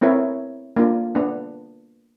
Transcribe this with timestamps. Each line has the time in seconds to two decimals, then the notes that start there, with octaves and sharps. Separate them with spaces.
0.01 B3 C4 E4 A#4 C#5
0.76 A#3 D4 F4
1.15 B3 D4